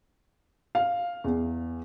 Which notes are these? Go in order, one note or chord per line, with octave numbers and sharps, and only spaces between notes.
F5
E2